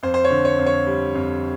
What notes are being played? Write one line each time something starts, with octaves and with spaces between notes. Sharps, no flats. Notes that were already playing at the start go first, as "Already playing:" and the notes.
F2 C5
C5
C#5
D3
C#5
F2
C#5
G3
F2